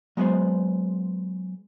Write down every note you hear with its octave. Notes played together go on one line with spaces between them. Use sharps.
F#3 G#3 B3 B4 C5